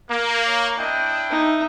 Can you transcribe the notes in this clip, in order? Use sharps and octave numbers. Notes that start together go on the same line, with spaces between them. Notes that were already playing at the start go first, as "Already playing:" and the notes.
A#3
C#5
D4 E4 D#5 G5
D#4 E5